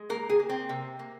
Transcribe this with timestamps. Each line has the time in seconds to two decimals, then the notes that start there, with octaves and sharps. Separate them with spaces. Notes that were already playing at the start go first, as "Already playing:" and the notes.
Already playing: G#3
0.10 A#3 A#4
0.30 G#4
0.39 A#3
0.49 C4
0.69 C3
0.99 A#3